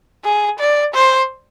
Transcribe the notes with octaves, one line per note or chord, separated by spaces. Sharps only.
G#4
D5
C5